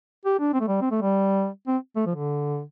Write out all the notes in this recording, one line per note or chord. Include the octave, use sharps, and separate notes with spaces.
G4
D4
C4
A3
G3
C4
A3
G3
C4
A3
F3
D3